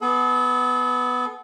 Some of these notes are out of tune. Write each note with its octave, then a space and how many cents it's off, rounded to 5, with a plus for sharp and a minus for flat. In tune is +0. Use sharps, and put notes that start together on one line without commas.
B3 +5 A4 -40